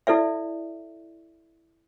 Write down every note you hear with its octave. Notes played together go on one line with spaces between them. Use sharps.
E4 A4 D5 E5